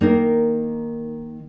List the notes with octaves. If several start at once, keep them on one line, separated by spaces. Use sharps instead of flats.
D#3 A#3 D#4 A#4